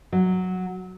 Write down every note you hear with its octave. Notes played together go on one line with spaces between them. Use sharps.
F#3